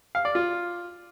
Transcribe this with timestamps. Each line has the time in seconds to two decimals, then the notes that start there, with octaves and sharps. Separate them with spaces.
0.15 F5
0.25 D5
0.35 F4